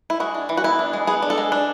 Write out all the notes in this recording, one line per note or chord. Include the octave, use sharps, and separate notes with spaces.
E4
G#3 F#4
D4
E3
F#4
B3 E4
D4
G#3
B3 G#4
D4
A4
G#3
D4